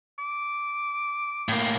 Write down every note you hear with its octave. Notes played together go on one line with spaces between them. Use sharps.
D6
A2 A#3